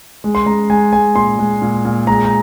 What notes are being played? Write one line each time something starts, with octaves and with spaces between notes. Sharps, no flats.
G#3
C6
G#3 A#5
G#3 G#5
G#3 G#5
A#2 C6
G#3
A#2
A#2
G#3 A#5
A#5